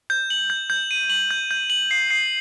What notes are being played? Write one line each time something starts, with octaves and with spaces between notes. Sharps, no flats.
G6
F#7
G6
G6
D#7
F#7
G6
G6
F#7
C7
C7